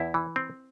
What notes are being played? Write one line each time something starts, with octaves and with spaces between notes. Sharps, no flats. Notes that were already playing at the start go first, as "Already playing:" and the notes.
Already playing: E2 E4
E3
C4